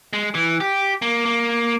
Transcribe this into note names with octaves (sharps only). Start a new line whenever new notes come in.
G#3
E3
G4
A#3
A#3